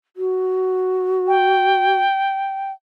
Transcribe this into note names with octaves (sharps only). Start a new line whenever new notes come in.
F#4
G5